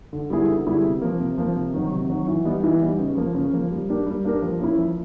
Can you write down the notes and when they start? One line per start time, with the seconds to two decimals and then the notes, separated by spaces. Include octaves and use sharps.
0.13 D3
0.30 G3 B3 E4 G#4
0.49 D3
0.66 G3 B3 E4 G#4
0.84 C3
1.02 F3 A#3
1.20 C3
1.38 F3 A#3
1.56 C3
1.74 D#3 F#3
1.92 C3
2.10 D#3 F#3
2.28 E3
2.45 G3 B3 D#4
2.64 E3
2.81 G3 B3 D#4
2.99 C#3
3.17 F3 A#3
3.35 C#3
3.53 F3 A#3
3.71 G3
3.89 A#3 D4 G4 A#4
4.06 G3
4.25 A#3 D4 G4 A#4
4.42 F3
4.60 A#3 C#4 E4
4.78 F3